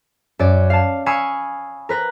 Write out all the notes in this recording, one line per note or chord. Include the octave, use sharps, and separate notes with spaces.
F#2 D5
F5 A5
F5 G#5 B5 C#6 D#6 E6
A#4 B4 A#6